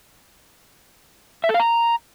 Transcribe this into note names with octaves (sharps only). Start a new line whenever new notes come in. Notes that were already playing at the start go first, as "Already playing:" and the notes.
E5
A4
F5
A#5